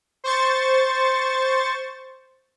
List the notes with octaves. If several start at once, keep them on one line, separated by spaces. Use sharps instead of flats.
C5 C#6 A6